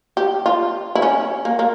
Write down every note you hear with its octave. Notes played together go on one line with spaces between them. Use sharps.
G4
F4
E4
C#4
A#3
A#3